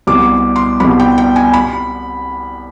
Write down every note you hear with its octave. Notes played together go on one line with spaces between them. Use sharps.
C2 B2 G3 D6
C6
C2 B2 G3 B5
G5
G5
G#5
B5